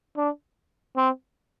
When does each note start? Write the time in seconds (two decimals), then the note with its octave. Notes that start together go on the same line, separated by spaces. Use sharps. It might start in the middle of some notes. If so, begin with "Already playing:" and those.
0.17 D4
0.97 C4